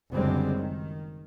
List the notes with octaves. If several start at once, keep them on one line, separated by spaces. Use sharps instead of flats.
F#1 C#2 D3 G3 G#3 C4
D#3